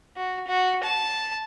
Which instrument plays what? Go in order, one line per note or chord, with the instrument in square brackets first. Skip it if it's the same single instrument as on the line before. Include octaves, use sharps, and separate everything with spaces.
[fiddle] F#4
F#4
A5